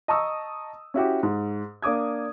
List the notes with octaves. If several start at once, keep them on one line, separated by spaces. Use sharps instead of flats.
D#5 A5 A#5 C#6 D#6 E6
C#4 E4 F#4 G4
G#2
A#3 D4 D6 D#6 G#6